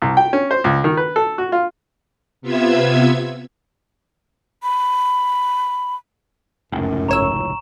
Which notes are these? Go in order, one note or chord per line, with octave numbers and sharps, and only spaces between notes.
C2
G5
C#4
C5
C#2
D#3
B4
A4
F#4
F4
C3 B3 F4 E5 E6 G#6
B5
F1 C#2 F#2 A2
G#1 C#5 A#5 C#6 E6 E7